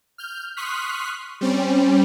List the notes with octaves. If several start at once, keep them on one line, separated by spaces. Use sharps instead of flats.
F6 G6
C6 C#6 D#6 F6 F#6 B6
G3 C4 C#4